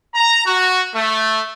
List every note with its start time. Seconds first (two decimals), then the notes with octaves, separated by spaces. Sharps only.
0.15 A#5
0.46 F#4
0.95 A3